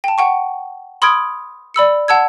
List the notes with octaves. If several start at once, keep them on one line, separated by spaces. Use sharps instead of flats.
G5 A5
F#5 G5 C#6
B5 C6 D#6 F6 G#6 D7
D5 B5 E6 C#7
F#5 A5 E6 G#6